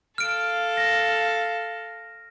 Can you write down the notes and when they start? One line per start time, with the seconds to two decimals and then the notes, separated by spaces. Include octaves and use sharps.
0.18 A4 F5 F6 D7
0.77 A#6